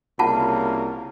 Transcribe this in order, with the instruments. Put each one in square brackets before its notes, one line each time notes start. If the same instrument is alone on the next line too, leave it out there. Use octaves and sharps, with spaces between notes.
[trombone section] C2 C#3 A#3 [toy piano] F4 F#5 A5